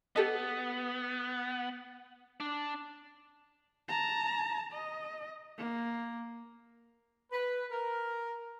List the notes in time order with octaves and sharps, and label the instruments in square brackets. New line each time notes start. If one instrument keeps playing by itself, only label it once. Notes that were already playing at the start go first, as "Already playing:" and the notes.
[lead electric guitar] B3 [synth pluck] G4 A4 D#5
[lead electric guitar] D4
[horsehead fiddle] A5 A#5
D#5
A#3
[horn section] B4
A#4